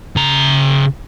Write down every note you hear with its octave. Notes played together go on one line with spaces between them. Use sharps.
C#3 A#5